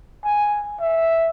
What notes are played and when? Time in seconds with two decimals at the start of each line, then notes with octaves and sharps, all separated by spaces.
0.25 G#5
0.81 E5